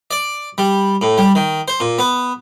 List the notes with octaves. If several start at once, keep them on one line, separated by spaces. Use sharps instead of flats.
D5
G3
A2
G3
D#3
C5
A#2
B3